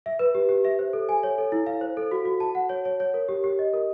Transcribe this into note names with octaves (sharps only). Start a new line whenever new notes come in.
E5
B4
G4
G4
E5
C5
A4
G#5
C#5
A4
E4
F5
C5
A4
F#4
F#4
A5
F#5
C#5
C#5
C#5
A#4
G4
G4
D#5
A#4